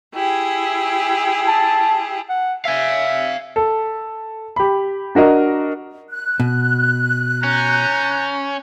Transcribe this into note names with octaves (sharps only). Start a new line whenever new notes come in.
E4 G4 G#4
A5
F#5
E5 F5 G#5
A4
G4 B5
D4 F#4 A#4 D#5
F#6
B2
C#4 A#5 G6